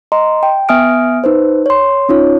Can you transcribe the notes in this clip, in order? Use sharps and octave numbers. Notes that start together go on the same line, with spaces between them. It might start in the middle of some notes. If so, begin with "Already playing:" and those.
D#5 A#5 C6
G5
B3 E5 G#5 D#6 F6 D7
D#4 B4 C5
C#5 C6
C#4 D#4 F4 C#5